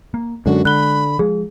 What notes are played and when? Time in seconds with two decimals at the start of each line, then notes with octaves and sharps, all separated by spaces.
0.14 A#3
0.46 F#2 D3 G#3 F#4
0.65 D3 B5 F#6 G7
1.19 F3 G#3 G#4